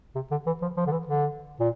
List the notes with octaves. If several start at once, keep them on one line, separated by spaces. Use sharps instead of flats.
C3
D3
E3
F3
F3
D3
E3
D3
A#2